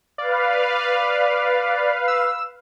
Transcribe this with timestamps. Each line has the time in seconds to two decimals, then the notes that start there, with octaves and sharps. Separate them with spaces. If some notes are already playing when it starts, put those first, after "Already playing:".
0.18 B4 D5 F5
2.08 E6